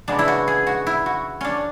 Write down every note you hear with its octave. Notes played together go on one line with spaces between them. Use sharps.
C#3 G#3 B3 D4
E4
F#4
G#4
F#4
E4
F#4
C#4 D4